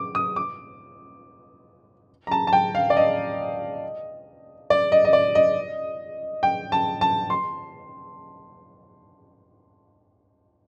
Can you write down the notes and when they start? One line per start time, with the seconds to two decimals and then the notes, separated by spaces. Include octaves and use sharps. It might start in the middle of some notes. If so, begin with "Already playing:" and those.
Already playing: D6
0.15 D#6
0.36 D6
2.27 A#5
2.31 A5
2.47 A5
2.53 G5
2.75 F5
2.90 D5
2.97 D#5
4.70 D5
4.92 D#5
5.05 D#5
5.13 D5
5.35 D#5
6.43 G5
6.72 A5
7.01 A5
7.30 C6